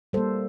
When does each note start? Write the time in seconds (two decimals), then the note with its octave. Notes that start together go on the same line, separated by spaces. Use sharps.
0.13 G3 A#3 A4 C5